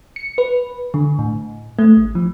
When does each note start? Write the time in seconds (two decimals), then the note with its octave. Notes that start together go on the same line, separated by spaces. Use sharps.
0.16 C#7
0.38 B4
0.94 D3
1.19 A2
1.79 A3
1.97 G#1
2.15 F3